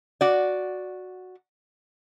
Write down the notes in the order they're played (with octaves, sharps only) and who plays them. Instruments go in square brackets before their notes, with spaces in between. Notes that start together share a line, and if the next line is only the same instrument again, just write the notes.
[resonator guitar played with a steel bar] F#4 D5